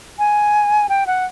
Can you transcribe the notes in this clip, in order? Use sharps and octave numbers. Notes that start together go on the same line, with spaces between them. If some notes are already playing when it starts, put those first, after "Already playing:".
G#5
G5
F#5